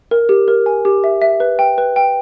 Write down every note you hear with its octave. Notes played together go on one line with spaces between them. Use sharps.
A#4
G4
A#4
G#5
G4
E5
E5
B4
G5
B4
G5